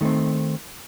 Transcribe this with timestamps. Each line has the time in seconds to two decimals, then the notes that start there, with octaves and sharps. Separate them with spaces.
0.01 D#3 A3 C4